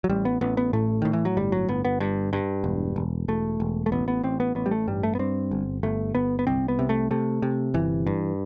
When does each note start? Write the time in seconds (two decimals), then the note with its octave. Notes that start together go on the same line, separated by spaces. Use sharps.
0.04 F#3
0.09 A1 G3
0.25 B3
0.41 A1 B3
0.57 B3
0.73 A2 A3
1.02 A2 D#3
1.13 E3
1.25 F#3
1.37 G1 G3
1.52 F#3
1.68 G1 B3
1.85 B3
2.00 G2
2.33 G2
2.64 E1
2.96 E1
3.28 E1 A3
3.60 E1
3.86 A3
3.92 A1 B3
4.08 B3
4.23 A1 C4
4.40 B3
4.55 A1 B3
4.66 G3
4.71 A3
4.87 G2 G3
5.03 A3
5.15 B3
5.19 G2 C4
5.51 G1
5.83 G1 A3
6.15 G1 B3
6.39 B3
6.47 C2 C4
6.68 B3
6.79 C3
6.89 A3
7.11 C3 A3
7.42 C3
7.74 G1 E3
8.07 G2